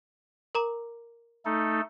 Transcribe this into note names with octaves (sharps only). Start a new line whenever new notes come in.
A#4 A#5 D6
A3 D#4 A4